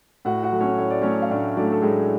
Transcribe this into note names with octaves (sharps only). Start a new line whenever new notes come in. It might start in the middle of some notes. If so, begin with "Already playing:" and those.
A2 F#4 F#5
F#4 F#5
F#3 A3
C#4 C#5
A2 C#5
D5
F#3 A3 C#4 C#5
F5
A2 D4 D5
F#3 A3 D4 D5
A4
A2 G#3 G#4